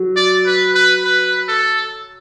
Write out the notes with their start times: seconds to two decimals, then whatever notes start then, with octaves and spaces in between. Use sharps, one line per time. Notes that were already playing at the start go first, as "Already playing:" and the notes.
Already playing: F#3
0.17 D5
0.46 B4
0.75 B4
1.05 B4
1.48 A4